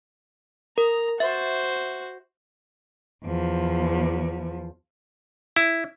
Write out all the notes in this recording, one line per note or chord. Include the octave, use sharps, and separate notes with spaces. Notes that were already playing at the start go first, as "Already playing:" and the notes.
A#4 A#5
F#4 C5 E5
E2 F3
E4